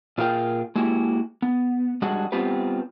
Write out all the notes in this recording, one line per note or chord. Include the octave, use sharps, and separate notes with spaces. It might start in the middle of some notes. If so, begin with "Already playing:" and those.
A#2 F4 G#4 A#4 F5 G5
G#3 A#3 E4 F#4 G4
B3
G3 G#3 D4 F#4 G#4 F#5
G3 B3 C4 F4 G4 B4